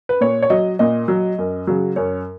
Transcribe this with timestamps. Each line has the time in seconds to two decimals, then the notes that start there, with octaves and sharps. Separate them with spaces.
0.09 B4
0.21 A#2 C#5
0.42 C#5
0.50 F#3 D#5
0.79 A#2 D#5
1.08 F#3
1.38 F#2
1.67 C#3 F#3
1.96 F#2 C#5